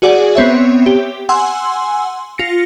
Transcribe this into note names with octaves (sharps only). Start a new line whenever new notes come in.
F#4 G#4 D5 F#5
B3 C4 C#5 E5
G4
F#5 G#5 C6 E6
F4 A#6 C#7